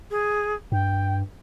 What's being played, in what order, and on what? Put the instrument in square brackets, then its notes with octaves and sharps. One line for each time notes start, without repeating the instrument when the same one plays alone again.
[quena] G#4
[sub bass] G2 [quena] G5